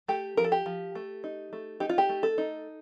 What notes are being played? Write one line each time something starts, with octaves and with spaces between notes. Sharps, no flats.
A3 G4
F3 A#4
A4
G4
F3
A3
D#4
A3
D#4 G4
F4
G4
A3
A4
D#4